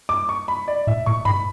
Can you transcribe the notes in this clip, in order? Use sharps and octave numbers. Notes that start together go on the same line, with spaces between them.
D6
C#6
B5
D5
A2 E5
A2 C#6
G#2 B5